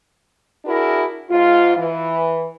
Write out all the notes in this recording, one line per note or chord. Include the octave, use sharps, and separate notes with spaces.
D4 E4 F#4 G#4 A#4
G#2 F4
E3